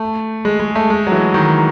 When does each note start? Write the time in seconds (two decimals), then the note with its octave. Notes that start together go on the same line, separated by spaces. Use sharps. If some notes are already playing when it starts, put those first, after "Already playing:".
Already playing: A3
0.45 G#3
0.60 G#3
0.75 A3
0.90 G#3
1.07 F#3
1.12 E3
1.34 D#3